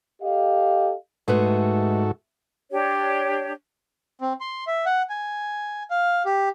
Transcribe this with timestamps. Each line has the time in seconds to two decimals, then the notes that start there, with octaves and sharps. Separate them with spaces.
0.23 G4 A4 D#5 F5
1.28 G#2 G#3 A3 F#4 A4 B4
2.71 D4 G4 C#5
4.21 C4
4.41 C6
4.67 E5
4.86 F#5
5.10 G#5
5.91 F5
6.26 G4